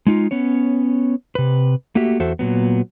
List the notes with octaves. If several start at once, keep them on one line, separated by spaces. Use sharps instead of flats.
G#3 D#4 F4
B3 C#4 C#5
C3 B4
A3 A#3 F#4 G4 E5
E2 F#4 A4 C5 E5
A#2 F#3 B3